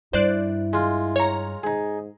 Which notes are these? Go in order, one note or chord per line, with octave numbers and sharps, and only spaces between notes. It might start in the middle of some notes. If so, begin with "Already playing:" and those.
G2 E4 C5 D5 F#6
G#3 F4
C#5 A#5
G#2 D#4 G#4